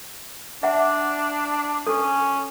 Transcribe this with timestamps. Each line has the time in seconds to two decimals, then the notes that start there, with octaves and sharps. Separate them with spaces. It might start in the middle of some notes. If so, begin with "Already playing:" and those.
0.63 D4 E5 F#5
1.87 C#4 A4